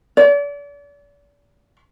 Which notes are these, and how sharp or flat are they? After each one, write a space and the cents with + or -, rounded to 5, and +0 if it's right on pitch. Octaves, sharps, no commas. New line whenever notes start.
D5 -40